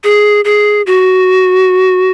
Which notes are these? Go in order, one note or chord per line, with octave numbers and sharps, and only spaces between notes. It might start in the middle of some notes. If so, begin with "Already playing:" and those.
G#4
G#4
F#4